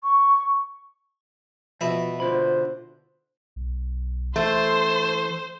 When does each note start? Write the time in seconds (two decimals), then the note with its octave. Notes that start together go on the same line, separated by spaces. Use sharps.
0.03 C#6
1.81 B2 F3 B4 E5
2.20 D3 F4 C5 B5
3.56 B1
4.36 E3 A3 C5 C6